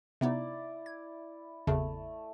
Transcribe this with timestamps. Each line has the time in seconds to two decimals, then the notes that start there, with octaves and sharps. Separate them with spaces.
0.21 C3 B3 D#4 E4 D5
0.86 G#6
1.67 G#1 E2 C#3 A3